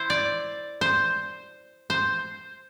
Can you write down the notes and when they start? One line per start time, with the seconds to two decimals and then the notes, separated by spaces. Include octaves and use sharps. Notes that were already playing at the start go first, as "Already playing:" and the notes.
Already playing: E4 C5
0.10 D5
0.81 C5
1.90 C5